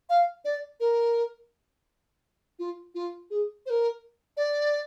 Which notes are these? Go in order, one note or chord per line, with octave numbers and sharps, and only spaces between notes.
F5
D5
A#4
F4
F4
G#4
C5
A#4
D5